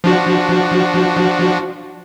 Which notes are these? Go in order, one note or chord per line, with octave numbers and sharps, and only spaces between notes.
F3 D4 F#4